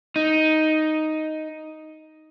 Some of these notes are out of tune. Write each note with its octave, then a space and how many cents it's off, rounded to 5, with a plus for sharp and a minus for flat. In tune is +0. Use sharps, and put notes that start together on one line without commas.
D#4 +5